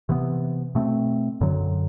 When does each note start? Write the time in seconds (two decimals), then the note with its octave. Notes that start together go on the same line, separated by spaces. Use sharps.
0.09 C3 E3 B3
0.75 B2 A3 C4
1.41 F#2 D3 F#3